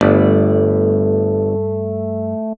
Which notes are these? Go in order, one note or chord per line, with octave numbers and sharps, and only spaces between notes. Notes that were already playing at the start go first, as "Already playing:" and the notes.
G1 G2 A3 B4 D5